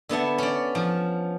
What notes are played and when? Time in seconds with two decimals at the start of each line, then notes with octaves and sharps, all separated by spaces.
0.09 D3 B3 E5 A5
0.38 C#4 D5
0.75 F3